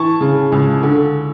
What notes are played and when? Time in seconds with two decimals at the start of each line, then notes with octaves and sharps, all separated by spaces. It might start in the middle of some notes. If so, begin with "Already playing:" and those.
Already playing: E3 A5 C#6
0.20 C#3
0.52 C#2
0.83 D3